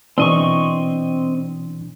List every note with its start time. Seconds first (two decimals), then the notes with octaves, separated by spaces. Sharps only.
0.18 B2 E3 C4 D4 D#5 C#6